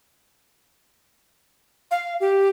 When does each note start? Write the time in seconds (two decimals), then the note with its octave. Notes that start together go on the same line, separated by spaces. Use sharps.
1.91 F5
2.20 G4